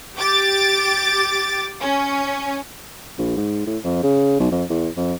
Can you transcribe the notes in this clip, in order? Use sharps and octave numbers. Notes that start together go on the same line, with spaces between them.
G4 D6 A6
C#4
A#1
G#2
A2
F2
C#3
B1
F2
E2
F2